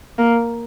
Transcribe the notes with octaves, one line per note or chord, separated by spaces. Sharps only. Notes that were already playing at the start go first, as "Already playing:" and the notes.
A#3